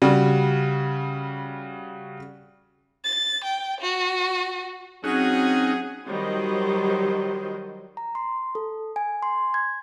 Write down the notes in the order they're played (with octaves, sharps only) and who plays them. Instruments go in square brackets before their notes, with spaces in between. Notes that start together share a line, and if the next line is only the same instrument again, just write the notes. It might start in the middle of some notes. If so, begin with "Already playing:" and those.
[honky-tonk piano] C#3 G3 F#4
[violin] A6
G5
F#4
[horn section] F#3 G#4 [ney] C4 [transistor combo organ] C#4 D#4 F#4
[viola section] D#3 F#3 G3 C5 D#5
[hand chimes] A#5
C6
A4
G#5
C6
G#6